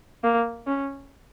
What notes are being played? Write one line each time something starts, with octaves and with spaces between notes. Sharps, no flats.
A#3
C#4